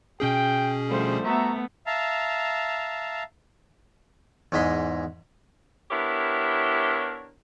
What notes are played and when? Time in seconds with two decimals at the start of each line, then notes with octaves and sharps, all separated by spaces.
0.20 B2 C#4 G#4 G5
0.89 D3 F3 G3 A3 C5
1.24 A3 B3 F#4 E5 A#5
1.87 E5 F5 A5 A#5
4.52 E2 G#2 G#3 B5 C6
5.90 B3 D4 E4 G4 A#4 C#5